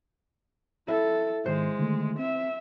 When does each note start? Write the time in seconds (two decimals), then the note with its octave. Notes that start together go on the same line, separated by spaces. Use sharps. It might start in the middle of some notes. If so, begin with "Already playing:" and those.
0.88 E4 A4
1.46 G#2 D#3 G#3 C5
1.79 D3 D#3 A3
2.19 C4 E5